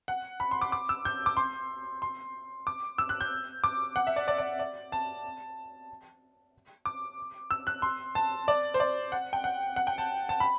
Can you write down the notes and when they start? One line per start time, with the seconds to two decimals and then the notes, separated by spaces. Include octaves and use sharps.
0.08 F#5
0.40 B5
0.51 C6
0.62 D6
0.72 D6
0.89 E6
1.05 G6
1.26 D6
1.37 C6
2.02 C6
2.67 D6
2.98 E6
3.09 F#6
3.21 G6
3.64 D6
3.96 F#5
4.07 E5
4.16 D5
4.28 D5
4.38 D5
4.60 D5
4.92 A5
6.86 D6
7.51 E6
7.67 F#6
7.82 C6
8.15 A5
8.48 D5
8.74 C5
8.80 D5
9.12 F#5
9.33 G5
9.44 F#5
9.76 F#5
9.87 G5
9.98 A5
10.29 A5
10.40 B5